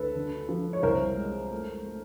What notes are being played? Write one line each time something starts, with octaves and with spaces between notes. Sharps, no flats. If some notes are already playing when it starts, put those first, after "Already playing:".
Already playing: D2 A4 B4
D3
F3
C#5
C2 A#4 C5
G#3
A3
A3